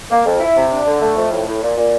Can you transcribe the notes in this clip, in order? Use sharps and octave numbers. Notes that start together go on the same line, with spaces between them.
A#3
F2
E4
C3
D4
D3
A3
F2
A2
A2
A#2
A#2